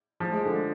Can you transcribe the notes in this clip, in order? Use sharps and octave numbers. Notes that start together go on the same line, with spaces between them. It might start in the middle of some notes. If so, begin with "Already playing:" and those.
F3
G#3
D3